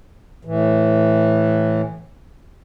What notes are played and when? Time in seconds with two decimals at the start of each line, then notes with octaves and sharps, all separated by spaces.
0.45 A2 E3